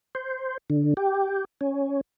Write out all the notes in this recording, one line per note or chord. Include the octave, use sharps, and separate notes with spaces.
C5
D3
G4
C#4